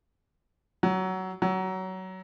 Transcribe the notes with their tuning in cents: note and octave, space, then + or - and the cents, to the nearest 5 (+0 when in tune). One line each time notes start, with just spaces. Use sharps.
F#3 +15
F#3 +20